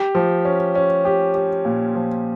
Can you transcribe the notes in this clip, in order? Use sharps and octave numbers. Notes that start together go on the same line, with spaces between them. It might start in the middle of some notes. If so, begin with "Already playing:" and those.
Already playing: G4
F3
C#4
C#4
G4
G4
A#2
F3